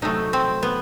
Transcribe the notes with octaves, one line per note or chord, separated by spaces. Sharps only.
C3 F#3 A3 D#4
C4
B3